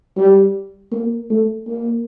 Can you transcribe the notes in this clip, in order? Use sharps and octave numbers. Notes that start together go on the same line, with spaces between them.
G3
A#3
A3
A#3